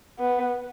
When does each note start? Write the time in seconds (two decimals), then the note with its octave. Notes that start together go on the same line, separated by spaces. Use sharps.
0.19 B3